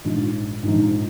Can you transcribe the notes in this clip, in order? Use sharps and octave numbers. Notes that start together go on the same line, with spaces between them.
A#1 G#2 F3
A#1 G#2 F3 D#4